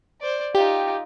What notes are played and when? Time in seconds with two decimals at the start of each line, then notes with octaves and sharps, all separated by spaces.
0.21 C5 D5
0.55 D#4 F4 G4